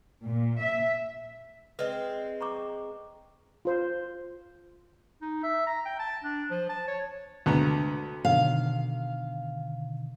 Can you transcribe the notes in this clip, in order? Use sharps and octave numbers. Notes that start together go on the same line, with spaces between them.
A#2
E5
G#3 C4 B4 D5 D#5
A#5 C#6 D6
F4 C5
D#4
E5
A#5
G5
A5
D4
F3
A5
C#5
D2 C3 G#3 B3 D4 A#5
B2 D3 D#3 F5